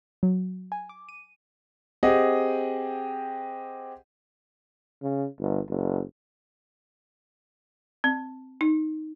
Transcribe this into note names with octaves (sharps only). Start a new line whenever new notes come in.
F#3
G#5
D6
D#7
C4 G4 G#4 D#5 F#5
C#3
G1
F#1
C4
D#4